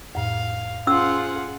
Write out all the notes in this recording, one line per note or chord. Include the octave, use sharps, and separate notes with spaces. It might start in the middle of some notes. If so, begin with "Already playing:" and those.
F2 A2 F5
C#4 F4 G#4 C5 F#5 E6